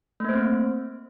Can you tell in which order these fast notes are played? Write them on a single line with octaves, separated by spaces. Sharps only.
A3 A#3 C5 C4